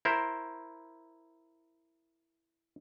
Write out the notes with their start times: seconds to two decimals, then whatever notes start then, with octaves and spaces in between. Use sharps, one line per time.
0.05 E4 A#4 C5